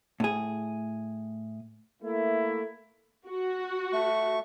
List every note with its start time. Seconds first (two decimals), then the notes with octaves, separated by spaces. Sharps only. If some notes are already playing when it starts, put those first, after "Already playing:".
0.20 A2 G#4
2.03 A3 A#3 E4
3.27 F#4
3.93 A3 C#6